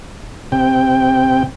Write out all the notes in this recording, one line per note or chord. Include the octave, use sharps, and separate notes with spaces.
C3 G5